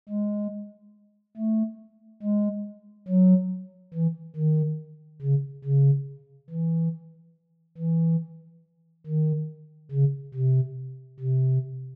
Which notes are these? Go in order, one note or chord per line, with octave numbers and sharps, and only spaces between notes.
G#3
A3
G#3
F#3
E3
D#3
C#3
C#3
E3
E3
D#3
C#3
C3
C3